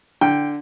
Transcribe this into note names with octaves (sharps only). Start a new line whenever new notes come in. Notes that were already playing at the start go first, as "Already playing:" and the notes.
D3 G5